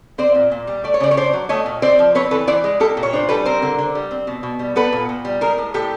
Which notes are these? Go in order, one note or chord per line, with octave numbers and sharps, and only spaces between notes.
C4 C5 D5
A#2
A#2
G3
A3 D5
C#5
C#3 C5 D5
C#5
D4 C5 D5
F#3
A3 C#5 D#5
A#2
C4 C5 D5
F3
C4 B4 C#5
E3 A4 B4
E3 C5 D5
G#3
A#3 G4 A4
A#2
C#5
D4 C5
G3 A4 B4
C4 A#4 C5
D3
D3
G3
C4
B2
B2
G3
B3 A4 B4
A#2
A#2
G3
G#3 G#4 A#4
A2
A2 G4 A4